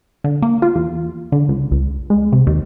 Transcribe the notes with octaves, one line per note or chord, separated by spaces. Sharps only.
D3
A#3
F4
E2
D3
C#2
C#2
G#3
C3
D#2